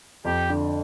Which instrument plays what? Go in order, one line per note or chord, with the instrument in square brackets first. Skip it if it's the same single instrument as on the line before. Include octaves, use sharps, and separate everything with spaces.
[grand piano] F2 [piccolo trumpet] G4
[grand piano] D3